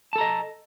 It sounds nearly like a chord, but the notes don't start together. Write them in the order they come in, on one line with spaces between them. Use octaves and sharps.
A5 A4 A#5 D#5